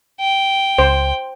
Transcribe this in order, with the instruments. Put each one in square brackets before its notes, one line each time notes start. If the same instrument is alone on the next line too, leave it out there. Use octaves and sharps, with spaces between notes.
[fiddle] G5
[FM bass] C#2 [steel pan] C5